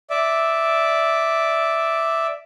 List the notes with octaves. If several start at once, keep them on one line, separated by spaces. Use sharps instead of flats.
D5 E5